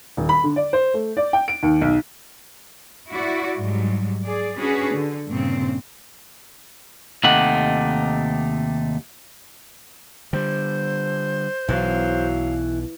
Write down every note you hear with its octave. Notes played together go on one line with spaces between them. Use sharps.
D#1
B5
D3
D5
C5
A3
D5
G5
D7
D#2
B1
E4 F#4 D5
G#2 F#3 G3
G#4 D5
C#4 D4 F#4 G#4 B4
D3
G2 A#2 C#3 C4
D#2 C3 A3 D#4 G4 F#5
D3 G3 C5
B1 B2 E3 F#3 F5